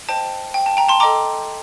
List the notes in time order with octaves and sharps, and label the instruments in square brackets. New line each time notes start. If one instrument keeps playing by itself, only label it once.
[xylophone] C5 D#5 G5 A5
G5
A5
G5 A#5
A5 C6
A4 D#5 G5 A#5 D6